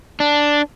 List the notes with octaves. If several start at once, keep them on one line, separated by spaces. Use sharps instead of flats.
D4